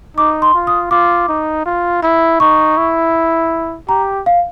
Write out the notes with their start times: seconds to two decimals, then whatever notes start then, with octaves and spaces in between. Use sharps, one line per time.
0.17 D#4 D6
0.42 C6
0.54 F4
0.67 D#6
0.91 F4 D6
1.28 D#4
1.65 F4
2.02 E4
2.40 D#4 C#6
2.77 E4
3.88 G4 A#5
4.26 F5